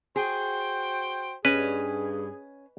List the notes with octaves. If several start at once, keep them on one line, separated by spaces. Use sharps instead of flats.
F#4 G#4 C5 G5
G2 C#4 G#4 B4 D#5 G#5